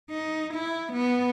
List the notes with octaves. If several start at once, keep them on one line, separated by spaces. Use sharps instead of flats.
D#4
E4
B3